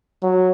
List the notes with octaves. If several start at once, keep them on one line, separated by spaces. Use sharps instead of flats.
F#3